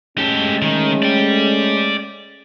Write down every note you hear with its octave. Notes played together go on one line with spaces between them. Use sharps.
G#3 A3 C#4 G4 A4
D#3
D5 G5